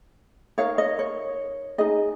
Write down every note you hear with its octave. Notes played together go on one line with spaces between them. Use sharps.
D#4 A#4 C#5 F5
D#5
C#5
D#4 G#4 D#5